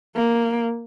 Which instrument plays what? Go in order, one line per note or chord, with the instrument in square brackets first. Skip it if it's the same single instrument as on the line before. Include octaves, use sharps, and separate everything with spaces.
[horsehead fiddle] A#3